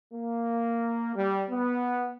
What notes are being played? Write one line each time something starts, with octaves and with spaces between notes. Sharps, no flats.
A#3
G3
B3